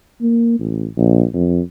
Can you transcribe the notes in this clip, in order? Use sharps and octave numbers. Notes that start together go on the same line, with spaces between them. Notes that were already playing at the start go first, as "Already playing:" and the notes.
A#3
A1
A#1
F2